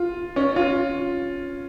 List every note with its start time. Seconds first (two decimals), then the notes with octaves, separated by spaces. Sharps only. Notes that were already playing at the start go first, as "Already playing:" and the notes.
Already playing: F4
0.36 C#4
0.56 F4